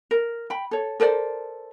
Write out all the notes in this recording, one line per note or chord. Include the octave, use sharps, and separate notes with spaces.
A#4
G5 B5
A4 C#5
A4 A#4 C5 D5